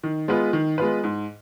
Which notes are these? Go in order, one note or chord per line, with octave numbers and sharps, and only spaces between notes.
D#3
G#3 B3 F4 B4
D#3
G#3 B3 F4 B4
G#2